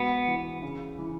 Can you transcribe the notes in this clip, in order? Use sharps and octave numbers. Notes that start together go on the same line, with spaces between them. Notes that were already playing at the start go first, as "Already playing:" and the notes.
Already playing: G#2 B3 F#4
E3
C#3
E3